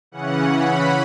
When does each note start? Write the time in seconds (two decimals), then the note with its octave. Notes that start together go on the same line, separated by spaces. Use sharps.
0.11 C#3 E3 C#4 F#5
0.54 B5